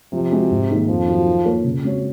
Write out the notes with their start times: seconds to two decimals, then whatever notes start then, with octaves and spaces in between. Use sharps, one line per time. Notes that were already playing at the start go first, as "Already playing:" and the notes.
0.13 C3 F3
0.32 G#3 C4 F#4
0.51 G#2
0.69 D#3 A#3 D#4 G#4
0.89 F2 F3
1.08 D#3 F#3
1.27 D#3
1.45 A#3 F4 A#4 C#5
1.64 C#3
1.84 G#3 C4 F#4 C#5